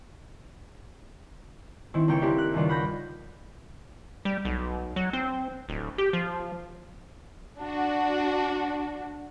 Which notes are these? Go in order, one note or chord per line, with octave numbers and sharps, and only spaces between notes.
D#3 C4 E4
C#2 A#3 G5 G6 C#7
A#3 C4 D4 E4 G4
F#6
C#2 G2 D#3 D4 F4
F#5 B5 F#6 G6 A#6
G3
B1
F#3
C4
D1
G4
F3
D4 F#4